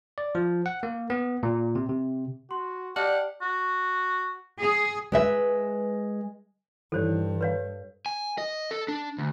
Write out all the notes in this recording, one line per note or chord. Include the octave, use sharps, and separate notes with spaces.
D5
F3
F#5
A#3
B3
A#2
C3
C3
F#4 C6
G4 D5 D#5 F#5 A5 F6
F#4
G#4
G#3 B4 E5
G2 D#3 E3 A4 C5 C#5
B4 C#5 F5
G#5
D#5
A4
D4
D2